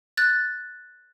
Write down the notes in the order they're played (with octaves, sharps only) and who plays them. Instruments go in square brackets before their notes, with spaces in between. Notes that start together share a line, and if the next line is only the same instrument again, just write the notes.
[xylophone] F#6 A6